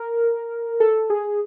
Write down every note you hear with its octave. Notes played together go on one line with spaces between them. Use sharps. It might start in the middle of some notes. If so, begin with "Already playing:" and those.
Already playing: A#4
A4
G#4